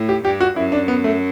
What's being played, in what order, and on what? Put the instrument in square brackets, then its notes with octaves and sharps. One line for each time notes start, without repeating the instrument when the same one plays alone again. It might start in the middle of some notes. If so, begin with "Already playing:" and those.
Already playing: [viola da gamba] A2
[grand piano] G4
[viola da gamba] G2 [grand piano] G4
[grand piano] F#4
[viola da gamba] F#2 [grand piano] E4
[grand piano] D4
B3
A3